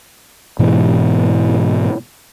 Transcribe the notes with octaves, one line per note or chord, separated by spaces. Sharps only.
G#2 B2 E3